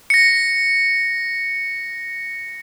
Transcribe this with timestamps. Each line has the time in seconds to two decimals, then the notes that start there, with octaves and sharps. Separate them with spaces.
0.10 A#6 C#7